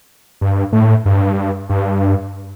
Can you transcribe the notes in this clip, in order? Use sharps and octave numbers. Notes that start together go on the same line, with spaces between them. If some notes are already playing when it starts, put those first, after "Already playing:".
G2
A2
G2
G2